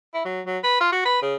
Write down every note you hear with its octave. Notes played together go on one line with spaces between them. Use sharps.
E4
F#3
F#3
B4
F4
F#4
B4
C#3